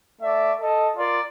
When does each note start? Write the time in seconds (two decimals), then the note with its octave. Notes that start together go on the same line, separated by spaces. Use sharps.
0.21 A3 D5 E5
0.61 A4 D#5
0.96 F4 A#4 D5